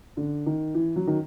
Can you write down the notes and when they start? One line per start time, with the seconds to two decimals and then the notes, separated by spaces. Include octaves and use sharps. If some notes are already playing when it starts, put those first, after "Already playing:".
0.17 D3
0.46 D#3
0.74 E3
0.96 F#3
1.07 D#3